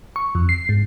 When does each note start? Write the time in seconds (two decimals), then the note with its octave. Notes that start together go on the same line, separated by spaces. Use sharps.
0.16 C#6
0.35 F2
0.49 C7
0.69 G#2